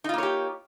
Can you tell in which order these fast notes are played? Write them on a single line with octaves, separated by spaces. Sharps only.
D#4 F4 A#3 C#5 G4